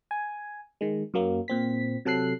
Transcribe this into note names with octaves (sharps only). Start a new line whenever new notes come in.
G#5
D#3 G#3
F#2 F#3 A#3
A#2 C4 B6
C3 F#3 A4 F#6 C7